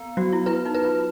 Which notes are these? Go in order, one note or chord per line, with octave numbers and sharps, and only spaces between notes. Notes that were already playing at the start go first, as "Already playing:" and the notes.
Already playing: B3
F#3 F#4
E4
E4 B4
D#4
B4
F4